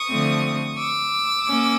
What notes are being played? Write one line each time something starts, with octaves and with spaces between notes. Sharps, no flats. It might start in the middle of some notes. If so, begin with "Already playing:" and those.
Already playing: C#6 D#6
D3 F3 A3 C4
D6 E6
A#3 C#4